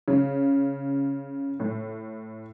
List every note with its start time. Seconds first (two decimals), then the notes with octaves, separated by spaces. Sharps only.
0.08 C#3
1.60 A2